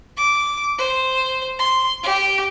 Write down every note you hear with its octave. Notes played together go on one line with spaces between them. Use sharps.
D6
C5
C6
G4